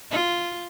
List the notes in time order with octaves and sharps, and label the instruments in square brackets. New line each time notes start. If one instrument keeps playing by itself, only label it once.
[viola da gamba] F4